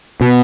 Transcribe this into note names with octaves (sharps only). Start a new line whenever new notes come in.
B2